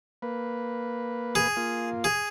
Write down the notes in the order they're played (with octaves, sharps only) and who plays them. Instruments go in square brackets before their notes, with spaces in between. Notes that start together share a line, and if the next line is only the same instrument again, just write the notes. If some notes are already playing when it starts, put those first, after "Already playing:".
[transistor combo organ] A#3 B4
[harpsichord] G#4
[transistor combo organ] A#3 F4
[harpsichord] G#4